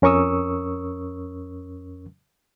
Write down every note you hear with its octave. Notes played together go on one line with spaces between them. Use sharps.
F2 C#4 A#4 C#6 D#6 E6